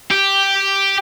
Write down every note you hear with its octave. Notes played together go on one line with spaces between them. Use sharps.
G4